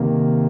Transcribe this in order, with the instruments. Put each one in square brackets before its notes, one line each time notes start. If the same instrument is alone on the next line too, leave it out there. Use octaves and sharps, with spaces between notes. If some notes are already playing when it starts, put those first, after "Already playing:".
Already playing: [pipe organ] C3 D#3 A#3